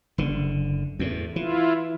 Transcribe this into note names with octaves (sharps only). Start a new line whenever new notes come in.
F#1 D3
E2 A2
E3 E4 F4